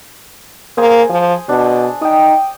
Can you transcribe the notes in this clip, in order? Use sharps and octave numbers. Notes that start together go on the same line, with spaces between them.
A#3 G#4 C5 G#5
F3
B2 D4
D#4 G5 D#6